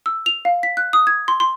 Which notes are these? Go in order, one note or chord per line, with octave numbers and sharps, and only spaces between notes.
E6
F7
F5
B6
F#6
D#6
G#6
C6
C6